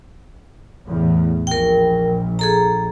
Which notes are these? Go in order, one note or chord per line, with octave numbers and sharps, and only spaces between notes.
E2 A2
A#1 A#4 G5
G#4 A4 A#5